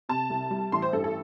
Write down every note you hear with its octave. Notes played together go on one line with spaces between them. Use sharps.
C3 A5
C2
G3
A1 C6
C5
G2 A4
A4